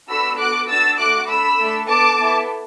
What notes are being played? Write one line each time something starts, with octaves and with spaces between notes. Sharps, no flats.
B3 D4 F#4 A4 B5 E6
B3 F#4 A4 D6 F#6
D4 F#4 A4 E6 A6
A3 F#4 A4 D6 F#6
D4 A4 B5 E6
A3 D4 A4
B3 D4 A4 A5 D6
B3 E4 A4